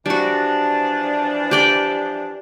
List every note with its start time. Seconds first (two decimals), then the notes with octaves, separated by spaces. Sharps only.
0.06 E3 F3 G3 D4 F#4
1.51 G4 D5 G5